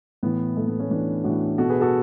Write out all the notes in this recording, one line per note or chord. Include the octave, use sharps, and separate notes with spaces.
A2 E3 B3
A2 E3 A3
B3
A3 C#4
A2 E3 B3 D4
A2 E3 D4 F#4
B2 F#4 A4
G#4 B4
F#4 A4